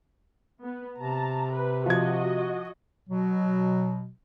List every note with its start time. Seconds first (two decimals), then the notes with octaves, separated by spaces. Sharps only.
0.63 B3
0.98 C3 A5 A#5
1.52 B4
1.86 F3 F#4 D#5 G#6
3.08 B2 F#3